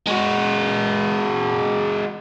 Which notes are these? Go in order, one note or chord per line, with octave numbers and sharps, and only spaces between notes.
G#3 F#4